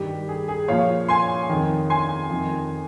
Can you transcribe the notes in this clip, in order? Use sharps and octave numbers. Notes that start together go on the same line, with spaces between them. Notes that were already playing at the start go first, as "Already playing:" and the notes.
Already playing: G2 D#3 G4
G#4
G#4
A#2 F3 C#5 F5
G#5 C6
F2 D#3
G#5 C6
F2 D#3